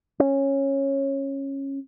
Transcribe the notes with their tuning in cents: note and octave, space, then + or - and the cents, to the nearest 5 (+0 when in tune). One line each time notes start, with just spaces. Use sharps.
C#4 -15